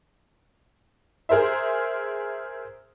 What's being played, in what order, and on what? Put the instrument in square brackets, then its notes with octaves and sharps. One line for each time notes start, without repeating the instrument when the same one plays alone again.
[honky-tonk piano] G#4 A#4 C5 E5